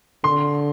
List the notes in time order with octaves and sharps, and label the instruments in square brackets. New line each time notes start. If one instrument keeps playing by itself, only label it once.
[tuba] D3 [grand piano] C6